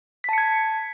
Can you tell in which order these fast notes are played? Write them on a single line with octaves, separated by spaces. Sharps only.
B6 A5 C#7 G#6